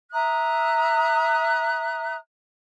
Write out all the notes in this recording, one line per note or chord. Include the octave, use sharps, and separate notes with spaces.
E5 A#5 D#6 F#6